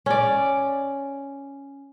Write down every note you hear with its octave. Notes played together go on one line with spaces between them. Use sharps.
C#4 D5